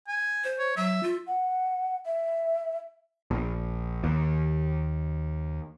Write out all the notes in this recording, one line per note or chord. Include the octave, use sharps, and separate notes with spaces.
G#5
C5
C#5
F#3 E5
F4
F#5
E5
A#1
D#2